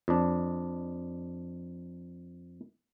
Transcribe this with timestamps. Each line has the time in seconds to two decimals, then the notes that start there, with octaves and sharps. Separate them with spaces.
0.08 F2 D4